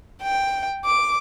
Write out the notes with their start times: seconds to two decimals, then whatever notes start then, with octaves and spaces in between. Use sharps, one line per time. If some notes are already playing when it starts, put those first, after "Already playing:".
0.22 G5
0.85 D6